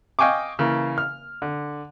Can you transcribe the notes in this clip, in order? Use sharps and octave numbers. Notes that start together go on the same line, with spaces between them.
D#5 F5 G5 G#5 C#6 D6
C#3 E3 A#3
F6
D3